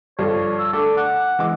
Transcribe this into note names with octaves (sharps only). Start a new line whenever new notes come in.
G2 D3 F3 C#5
E6
D3 A3 A4 D5
F#5 D6
E3 G#3 D6